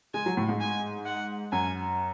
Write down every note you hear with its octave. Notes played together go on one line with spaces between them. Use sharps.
G#3 G#5
F#3
A2
G#2
G#5
F#5
F#2 G#5